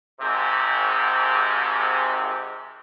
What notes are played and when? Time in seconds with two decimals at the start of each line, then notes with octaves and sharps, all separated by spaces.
0.20 G#1 G#2 C3